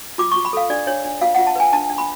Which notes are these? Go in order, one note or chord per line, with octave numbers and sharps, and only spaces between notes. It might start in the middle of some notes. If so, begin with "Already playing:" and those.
F4 D6
C#6
F4
B5
A4 F5
D4 D5
D4 C#5
D4
F4 F5
F4 F#5
A5
B4 G#5
D4 A5
D4
B5